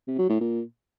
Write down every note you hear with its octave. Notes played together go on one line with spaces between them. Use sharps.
C3
F#3
A2
A#2